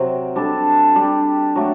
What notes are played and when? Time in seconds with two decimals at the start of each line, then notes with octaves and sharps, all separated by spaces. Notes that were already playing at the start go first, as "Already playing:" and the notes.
Already playing: C3 F#3 C4
0.36 G3 D4 A4
0.95 G3 D4 G4
1.55 F#3 A3 D4